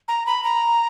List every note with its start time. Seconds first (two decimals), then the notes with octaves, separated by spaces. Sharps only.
0.08 A#5
0.26 B5
0.44 A#5